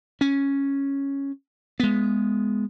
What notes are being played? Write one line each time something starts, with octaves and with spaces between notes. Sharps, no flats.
C#4
G#3 B3